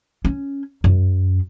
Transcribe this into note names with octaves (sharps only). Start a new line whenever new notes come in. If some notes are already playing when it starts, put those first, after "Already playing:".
C#4
F#2